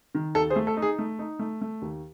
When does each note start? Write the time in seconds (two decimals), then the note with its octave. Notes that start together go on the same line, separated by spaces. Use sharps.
0.15 D#3
0.35 D#2 A4
0.50 G#4 C5
0.56 A3
0.67 A4
0.77 D#4
0.82 G#4
0.99 A3
1.19 D#4
1.39 A3
1.61 A3
1.82 D#2